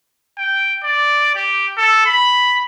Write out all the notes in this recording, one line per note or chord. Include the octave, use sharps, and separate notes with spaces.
G5
D5
G4
A4
B5